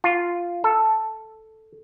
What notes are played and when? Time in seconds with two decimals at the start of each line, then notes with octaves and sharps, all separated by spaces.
0.04 F4
0.64 A4